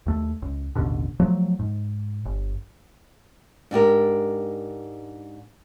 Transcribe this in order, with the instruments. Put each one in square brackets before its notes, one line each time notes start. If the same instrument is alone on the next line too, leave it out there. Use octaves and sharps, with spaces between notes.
[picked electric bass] D#2 A3
C#2
A1 D#2 B2 D3
F3 F#3 A3
G#2
G1
[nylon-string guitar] G#2 D4 G4 A#4